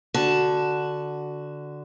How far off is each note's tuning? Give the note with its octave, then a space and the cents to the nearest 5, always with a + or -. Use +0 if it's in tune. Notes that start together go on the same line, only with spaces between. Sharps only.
D3 +0 F#4 +0 A5 +0